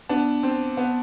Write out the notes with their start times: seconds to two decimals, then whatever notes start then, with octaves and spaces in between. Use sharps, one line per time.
0.09 B3 D4
0.43 C4
0.77 B3